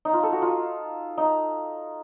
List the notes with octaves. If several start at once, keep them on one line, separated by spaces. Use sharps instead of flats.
D#4
F4
A4
F#4
F4
D#4